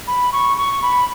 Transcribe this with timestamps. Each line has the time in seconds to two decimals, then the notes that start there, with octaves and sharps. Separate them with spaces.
0.07 B5
0.32 C#6
0.57 C#6
0.82 B5